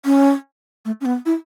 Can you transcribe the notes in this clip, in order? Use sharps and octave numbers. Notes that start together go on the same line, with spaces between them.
C#4
A3
C#4
B3
E4